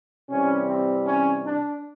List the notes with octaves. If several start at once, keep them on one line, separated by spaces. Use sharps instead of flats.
C3 E3 G3 C#4
C4
C#4
D4